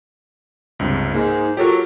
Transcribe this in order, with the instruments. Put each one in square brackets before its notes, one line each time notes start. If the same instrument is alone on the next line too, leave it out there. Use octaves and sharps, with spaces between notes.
[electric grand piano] C#2 G2 C3
[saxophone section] G#2 [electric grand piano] A#3 [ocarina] D#4
[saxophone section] F#3 [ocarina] F4 [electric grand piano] G4 A4 A#4